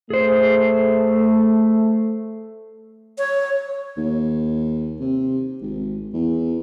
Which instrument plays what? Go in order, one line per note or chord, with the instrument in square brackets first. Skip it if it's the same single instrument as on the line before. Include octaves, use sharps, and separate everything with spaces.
[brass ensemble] A3 [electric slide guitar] G#4 C5
[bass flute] C#5
[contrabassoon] D#2
C3
G#1
E2